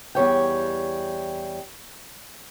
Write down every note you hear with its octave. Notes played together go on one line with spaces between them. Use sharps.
E2 G3 C#5 G5